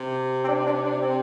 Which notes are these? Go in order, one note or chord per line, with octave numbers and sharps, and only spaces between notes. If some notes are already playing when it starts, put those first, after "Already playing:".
Already playing: C3
C4
D4
D4
D4
C4